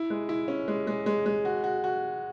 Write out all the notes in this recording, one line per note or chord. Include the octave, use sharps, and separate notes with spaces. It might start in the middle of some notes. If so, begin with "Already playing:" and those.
Already playing: E4
G#3
E4
C#4
G#3
G#3
G#3
G#3
F#4
F#4
F#4